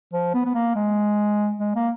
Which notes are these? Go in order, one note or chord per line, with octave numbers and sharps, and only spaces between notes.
F3
B3
B3
A#3
G#3
G#3
A#3